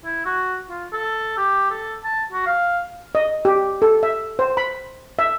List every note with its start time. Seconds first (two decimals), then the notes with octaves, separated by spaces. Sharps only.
0.06 E4
0.26 F#4
0.70 F4
0.93 A4
1.38 G4
1.71 A4
2.05 A5
2.33 F#4
2.46 F5
3.15 D#5
3.45 G4
3.82 A4
4.03 E5
4.39 C5
4.57 B5
5.19 E5